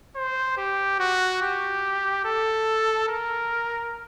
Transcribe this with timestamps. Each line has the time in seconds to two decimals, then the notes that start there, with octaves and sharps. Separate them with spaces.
0.16 C5
0.57 G4
1.00 F#4
1.42 G4
2.25 A4
3.09 A#4